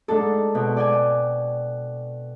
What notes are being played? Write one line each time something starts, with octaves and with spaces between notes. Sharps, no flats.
G#2 D4 A4
B2 C4
D5 G5 G#5